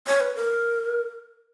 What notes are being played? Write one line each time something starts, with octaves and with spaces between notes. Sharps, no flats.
C#5
B4
A#4